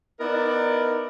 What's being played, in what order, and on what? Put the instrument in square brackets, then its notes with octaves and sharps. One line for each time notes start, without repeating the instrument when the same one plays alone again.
[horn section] B3 D#4 E4 A#4 D5